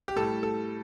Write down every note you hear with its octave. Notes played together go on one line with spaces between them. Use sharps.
G4
A2 G3 A4
A4